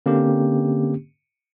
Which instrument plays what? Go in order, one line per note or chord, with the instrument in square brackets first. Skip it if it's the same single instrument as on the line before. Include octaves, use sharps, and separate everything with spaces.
[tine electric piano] D3 A#3 C4 C#4 G4